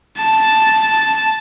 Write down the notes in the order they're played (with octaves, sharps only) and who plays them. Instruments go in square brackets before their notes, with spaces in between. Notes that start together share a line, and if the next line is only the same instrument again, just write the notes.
[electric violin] A5